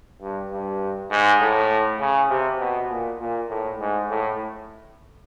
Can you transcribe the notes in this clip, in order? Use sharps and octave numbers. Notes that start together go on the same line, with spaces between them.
G2
G2
G#2
A2
C#3
C3
B2
A#2
A#2
A2
G#2
A2